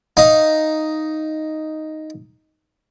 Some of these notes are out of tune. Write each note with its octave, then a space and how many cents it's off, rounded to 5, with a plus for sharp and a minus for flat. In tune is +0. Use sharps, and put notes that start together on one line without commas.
D#4 +0 F5 +0